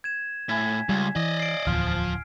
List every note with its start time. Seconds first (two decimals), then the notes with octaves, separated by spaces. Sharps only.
0.04 G#6 E7
0.49 A2 G#5 G#6 B6
0.89 C#2 G3
1.16 E3 D5 D#5
1.39 C7 D7
1.67 D1 E2 F3 F6